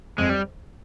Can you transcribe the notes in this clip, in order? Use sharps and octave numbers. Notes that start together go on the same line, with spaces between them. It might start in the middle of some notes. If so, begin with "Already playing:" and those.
F2 G#3
G3